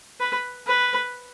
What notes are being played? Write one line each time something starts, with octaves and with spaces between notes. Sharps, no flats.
B4
B4